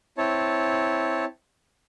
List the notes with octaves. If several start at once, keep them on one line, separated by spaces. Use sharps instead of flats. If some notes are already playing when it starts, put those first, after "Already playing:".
C4 E4 C#5 A5